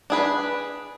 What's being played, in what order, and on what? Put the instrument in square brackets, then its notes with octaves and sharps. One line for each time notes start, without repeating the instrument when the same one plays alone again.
[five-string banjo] D4 G#4 B4